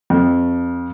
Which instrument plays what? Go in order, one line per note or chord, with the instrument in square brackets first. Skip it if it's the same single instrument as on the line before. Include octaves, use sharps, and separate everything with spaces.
[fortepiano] F2